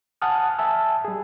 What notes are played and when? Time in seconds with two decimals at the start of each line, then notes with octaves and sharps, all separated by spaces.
0.22 F#5 G#5 A5 D#6 F6
0.59 E5 G#5 A5 E6
1.05 G3 G#4